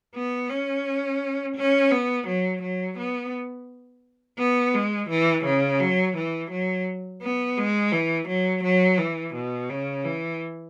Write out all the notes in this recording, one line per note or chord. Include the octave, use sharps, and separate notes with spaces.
B3
C#4
C#4
B3
F#3
F#3
B3
B3
G#3
E3
C#3
F#3
E3
F#3
B3
G#3
E3
F#3
F#3
E3
B2
C#3
E3